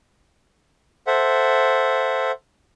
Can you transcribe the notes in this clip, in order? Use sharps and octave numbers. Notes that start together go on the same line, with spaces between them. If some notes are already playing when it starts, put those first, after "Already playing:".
A4 C5 E5 F#5